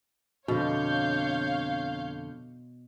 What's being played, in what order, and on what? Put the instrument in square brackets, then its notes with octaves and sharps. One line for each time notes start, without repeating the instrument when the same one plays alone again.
[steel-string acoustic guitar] F2 D3 [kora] B2 [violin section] C#5 F5 G6